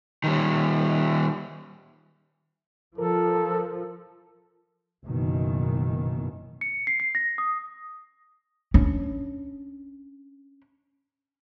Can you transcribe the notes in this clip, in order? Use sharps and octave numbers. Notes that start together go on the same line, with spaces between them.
D#3 G3
F3 A4 A#4
F#1 B2 D#3 E3
C#7
C7
C7
A#6
D#6
C#4 D4